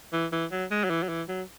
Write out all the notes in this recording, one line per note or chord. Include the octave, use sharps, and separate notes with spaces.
E3
E3
F#3
G#3
F#3
E3
F#3
E3
F#3